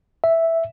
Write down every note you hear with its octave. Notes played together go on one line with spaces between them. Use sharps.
E5